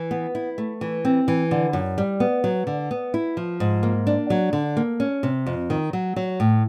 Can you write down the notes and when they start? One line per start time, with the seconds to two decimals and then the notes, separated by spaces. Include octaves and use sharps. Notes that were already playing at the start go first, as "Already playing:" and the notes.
Already playing: E3
0.11 B3
0.35 E4
0.58 A3
0.81 E3
1.05 C4
1.28 E3
1.51 D3
1.73 F#2
1.98 G3
2.20 B3
2.44 F#3
2.67 D3
2.91 B3
3.14 E4
3.37 F3
3.60 G#2
3.83 A#3
4.07 D4
4.30 F#3
4.53 D3
4.77 A#3
5.00 C#4
5.23 C3
5.46 F2
5.70 D#3
5.93 F#3
6.16 F#3
6.40 A2